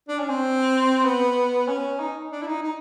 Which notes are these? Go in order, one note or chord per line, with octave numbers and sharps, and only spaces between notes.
D4
C#4
C4
B3
C#4
D#4
D4
E4
D#4
D#4